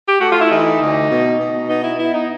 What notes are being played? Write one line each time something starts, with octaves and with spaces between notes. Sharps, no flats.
G4
A3 F#4
F4
E4
E3 D#4
D2
B2
B2
B3 D#4
E4
B3 E4
D#4